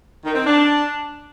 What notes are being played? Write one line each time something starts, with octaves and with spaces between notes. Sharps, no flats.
D#3
C4
D4